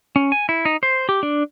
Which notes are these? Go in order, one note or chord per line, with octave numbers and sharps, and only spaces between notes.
C#4
G#5
E4
D#4
C5
G4
D4